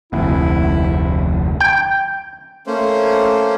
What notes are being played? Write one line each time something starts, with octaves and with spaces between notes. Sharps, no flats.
F1 D2 E4
G5
A3 A#3 C#4 C5